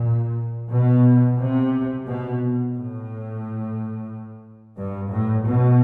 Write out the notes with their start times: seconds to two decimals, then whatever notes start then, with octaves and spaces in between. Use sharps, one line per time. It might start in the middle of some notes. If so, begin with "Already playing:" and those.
Already playing: A#2
0.70 B2
1.38 C3
2.06 B2
2.74 A2
4.77 G2
5.11 A2
5.46 B2